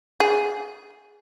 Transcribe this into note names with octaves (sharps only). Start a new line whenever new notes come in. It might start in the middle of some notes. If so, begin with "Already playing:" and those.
G#4